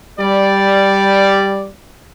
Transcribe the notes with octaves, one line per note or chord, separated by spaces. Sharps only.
G3 D5